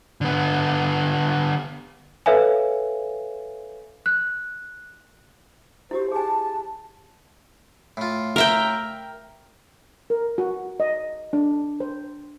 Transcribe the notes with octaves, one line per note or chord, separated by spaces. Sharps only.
D3 B3
A4 B4 C#5 E5 F5 G#5
F#6
E4 F#4 G4 C5
G#4 G#5 A5
A2 F4
A#4 E5 G5
A#4
F#4
D#5
D4
C5